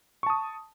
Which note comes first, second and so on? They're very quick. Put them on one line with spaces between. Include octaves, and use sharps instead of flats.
C#6 A5 D#6